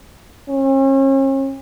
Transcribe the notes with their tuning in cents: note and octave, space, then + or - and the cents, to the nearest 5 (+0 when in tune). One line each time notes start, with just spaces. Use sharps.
C#4 -40